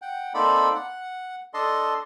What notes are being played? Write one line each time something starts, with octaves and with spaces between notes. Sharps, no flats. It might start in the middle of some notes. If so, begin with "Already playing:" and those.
F#5 G5
A#3 C4 D#4 A4 D5 B5
F#5
D4 A4 D#5 A5 C6